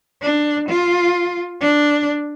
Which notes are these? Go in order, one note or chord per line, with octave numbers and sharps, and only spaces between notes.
D4
F4
D4